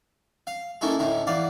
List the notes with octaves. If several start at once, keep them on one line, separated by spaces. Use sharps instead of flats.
F5
A#3 C#4 D#4 E4 A4
D2 A2 A3 D#4
E2 D5 F5